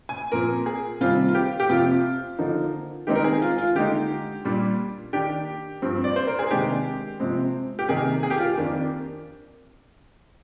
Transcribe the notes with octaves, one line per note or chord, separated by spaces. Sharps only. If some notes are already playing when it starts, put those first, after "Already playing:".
G#5
A#2 F3 C4 A#4
G#4
C3 D#3 G3 C4 F4
F4
G4
G4
F2 C3 F3 F4
D3 F3 A#3 D#4
D#3 G#3 C4 D#4 G4
A#4
G#4
F4
F4
D3 G#3 D#4 G4
A#2 G3 D4
D#3 A#3 D4 G4
G2 F3 C4
D5
C5
A#4
G#4
C3 D#3 G#3 D4 G4
C3 F3 G#3 C4
G4
C3 D#3 A#3 D#4 G#4
G#4
G4
F4
G4
F2 D#3 A#3 D4